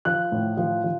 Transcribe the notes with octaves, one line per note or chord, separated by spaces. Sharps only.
F3 F#6
A2
F3
F3